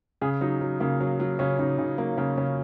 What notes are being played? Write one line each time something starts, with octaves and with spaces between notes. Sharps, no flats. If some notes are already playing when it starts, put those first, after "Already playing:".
C#3 G#4
F#3 D#4
F#3
C#3 A#3
F#3
F#3
C#3 C#4
C#3 D#4
C#3 D#4
F#3 A#3
C#3 A#3
C#3 C#4